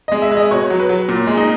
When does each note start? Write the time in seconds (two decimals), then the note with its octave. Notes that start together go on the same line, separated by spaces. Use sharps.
0.08 G#3 D#5
0.22 E5
0.31 G#3 D#5
0.51 B2 C#5
0.70 F#3
0.80 B4
0.89 F#3
1.09 A#2
1.27 G#3
1.37 D#4